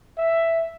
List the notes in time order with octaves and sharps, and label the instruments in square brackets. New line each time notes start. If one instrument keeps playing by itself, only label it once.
[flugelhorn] E5